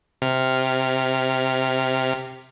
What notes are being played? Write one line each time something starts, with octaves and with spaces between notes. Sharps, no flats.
C3 F6